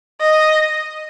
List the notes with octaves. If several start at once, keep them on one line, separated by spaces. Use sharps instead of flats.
D#5